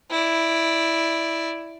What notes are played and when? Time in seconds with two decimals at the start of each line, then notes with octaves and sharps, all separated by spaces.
0.10 E4 D5